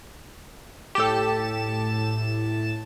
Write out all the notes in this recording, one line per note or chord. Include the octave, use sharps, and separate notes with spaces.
A2 G4 A4 A5 E7